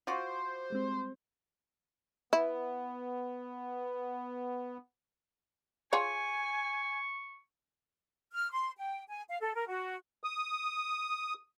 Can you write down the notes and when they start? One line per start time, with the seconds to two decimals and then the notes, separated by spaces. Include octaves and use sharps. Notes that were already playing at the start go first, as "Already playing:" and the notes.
0.07 F4 F#4 C5 D6
0.70 G3 G#3 C4
2.33 B3 E4
5.93 F4 G#4 C#5 G#5 C#6
8.32 F6
8.51 C6
8.77 G5
9.08 G#5
9.29 F5
9.41 A4
9.55 A#4
9.68 F#4
10.23 D#6